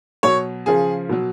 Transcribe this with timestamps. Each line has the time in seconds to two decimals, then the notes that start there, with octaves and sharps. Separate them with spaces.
0.23 B2 F#3 C#5
0.66 C#3 F3 G#4
1.09 B2 F#3